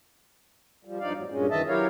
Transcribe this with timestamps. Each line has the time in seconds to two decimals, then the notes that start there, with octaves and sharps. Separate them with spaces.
0.85 F3 G3
1.00 G2 F3 D#4 D5 F5
1.14 E2 G#2 F#3
1.30 G2 A#2 G#3 C#4
1.51 F#2 D#3 E3 D#5 E5 A5
1.68 F#3 E4 G4 A#4 C#5 F5